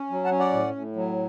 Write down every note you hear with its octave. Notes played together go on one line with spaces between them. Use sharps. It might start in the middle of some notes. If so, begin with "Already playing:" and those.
Already playing: C#4
F#3
F#5 A5
C#4
D5 F#5
A2
A2
F#3